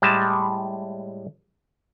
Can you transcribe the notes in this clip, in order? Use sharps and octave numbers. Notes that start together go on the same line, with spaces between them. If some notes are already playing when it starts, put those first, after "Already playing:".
A2 G3 G#3 A5